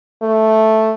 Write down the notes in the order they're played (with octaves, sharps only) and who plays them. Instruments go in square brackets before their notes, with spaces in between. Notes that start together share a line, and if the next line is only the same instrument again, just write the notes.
[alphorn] A3